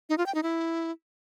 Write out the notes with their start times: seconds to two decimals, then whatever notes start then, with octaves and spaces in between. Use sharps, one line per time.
0.09 D#4
0.18 F4
0.26 G5
0.35 D#4
0.43 E4